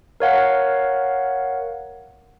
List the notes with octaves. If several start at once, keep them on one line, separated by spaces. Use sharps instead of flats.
A#4 C#5 F5 F#5